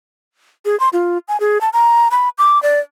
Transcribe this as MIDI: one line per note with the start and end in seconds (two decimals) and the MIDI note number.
0.65 0.78 68
0.80 0.89 84
0.93 1.18 65
1.28 1.40 80
1.40 1.61 68
1.61 1.69 81
1.73 2.08 82
2.11 2.29 83
2.38 2.61 86
2.63 2.80 74